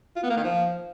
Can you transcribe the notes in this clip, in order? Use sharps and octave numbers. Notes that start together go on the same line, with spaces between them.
F4
B3
A#3
D#3
F3